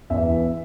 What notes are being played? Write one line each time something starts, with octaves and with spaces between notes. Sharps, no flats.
E2 E5
E3